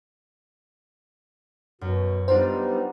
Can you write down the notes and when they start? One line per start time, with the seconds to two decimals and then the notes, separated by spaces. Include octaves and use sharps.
1.81 F#2 B2
2.28 G3 B3 D4 D#4 F4 C5 A#5